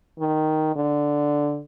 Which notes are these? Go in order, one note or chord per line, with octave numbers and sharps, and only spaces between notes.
D#3
D3